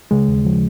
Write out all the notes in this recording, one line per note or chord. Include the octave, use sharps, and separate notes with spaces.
C#3 G#3
D#2
F3